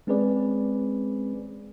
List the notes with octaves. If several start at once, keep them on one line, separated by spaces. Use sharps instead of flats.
G#3 C4 C#4 G#4 B4 D5